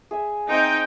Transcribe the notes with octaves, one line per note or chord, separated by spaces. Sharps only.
G#4 E5 G#5
C4 D#4 E5 G5